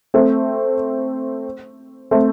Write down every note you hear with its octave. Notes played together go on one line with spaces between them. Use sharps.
A3 C4
A3 C4